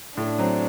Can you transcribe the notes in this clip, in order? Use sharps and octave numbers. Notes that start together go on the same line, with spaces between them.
A2 D4
F#3 C4